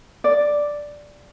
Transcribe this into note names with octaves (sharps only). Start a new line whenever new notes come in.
D5